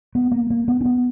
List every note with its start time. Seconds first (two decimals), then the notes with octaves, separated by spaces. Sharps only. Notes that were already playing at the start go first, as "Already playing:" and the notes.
0.15 B3
0.31 A#3
0.50 A#3
0.68 B3
0.81 D4
0.85 B3